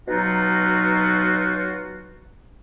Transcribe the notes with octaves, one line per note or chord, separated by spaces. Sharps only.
B2 F#3 D#4 F4 F#4